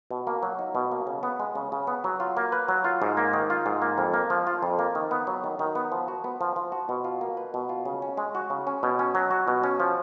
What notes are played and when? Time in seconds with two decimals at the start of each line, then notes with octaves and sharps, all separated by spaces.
0.11 B2
0.27 A#3
0.43 F#3
0.59 D#4
0.75 B2
0.92 A#3
1.07 C#3
1.23 B3
1.40 G#3
1.55 C#3
1.72 C#3
1.87 B3
2.04 F#3
2.20 F4
2.37 A#3
2.52 B4
2.68 F#3
2.84 F4
3.02 G#2
3.17 A#3
3.33 D#3
3.50 F4
3.66 G#2
3.82 A#3
3.98 F2
4.14 A#3
4.30 F3
4.47 F4
4.63 F2
4.79 A#3
4.95 D#3
5.11 B3
5.27 F#3
5.44 D#3
5.59 D#3
5.75 B3
5.92 F3
6.08 F#4
6.24 B3
6.41 F3
6.56 F3
6.72 F#4
6.89 B2
7.04 F4
7.21 A#3
7.37 B4
7.54 B2
7.69 F4
7.86 C#3
8.02 C#4
8.17 G#3
8.35 F#4
8.50 C#3
8.67 C#4
8.83 B2
8.99 C#4
9.15 F#3
9.31 F#4
9.48 B2
9.64 C#4
9.80 F3